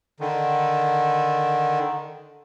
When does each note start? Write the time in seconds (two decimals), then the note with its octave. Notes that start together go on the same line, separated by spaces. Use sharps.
0.20 D3 D#3